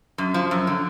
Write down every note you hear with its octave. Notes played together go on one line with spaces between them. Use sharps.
F#2
F3
F#2
D3